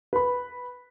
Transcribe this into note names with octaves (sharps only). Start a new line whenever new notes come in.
B4 B5